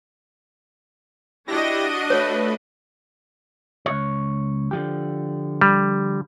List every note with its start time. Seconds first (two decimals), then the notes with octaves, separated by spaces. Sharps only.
1.48 D4 E4 F#4 G4 D#5 A#6
2.10 A3 B4 C#5
3.86 C#2 C#5
4.71 D3 F3 G4
5.61 G3